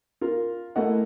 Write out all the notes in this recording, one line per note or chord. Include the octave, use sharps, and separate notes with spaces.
F4 A#4
A3 A#3 E4 D#5 F#5